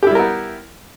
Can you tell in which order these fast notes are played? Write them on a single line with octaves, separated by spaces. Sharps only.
G4 E4 G3 A#4 B3